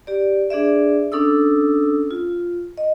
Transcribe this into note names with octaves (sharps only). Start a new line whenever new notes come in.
G4 D5
D4 G#4 D5 E5
C#4 D4 A4 D#6 E6
F4
D#5